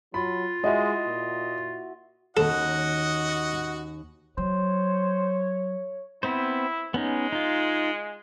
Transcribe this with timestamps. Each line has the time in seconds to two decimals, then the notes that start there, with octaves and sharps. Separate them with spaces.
0.14 F#3 F4 B5
0.64 G#3 E4 F#4 D#5 E5
1.07 A#2
2.37 D#2 A#3 C#4 F#4 A4 D#5 F#5
4.38 F#3 C5 C#5
6.23 B3 C4 E4 C5
6.94 G#3 B3 C#4 D#4
7.32 D#4 F4